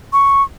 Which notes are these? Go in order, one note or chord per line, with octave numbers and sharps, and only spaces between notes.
C#6